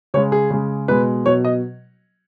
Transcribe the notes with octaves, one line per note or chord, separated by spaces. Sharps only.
C#3 G#3 C#5
G#4
C#3 G#3
B2 G#3 B4
B2 F#3 C#5
D#5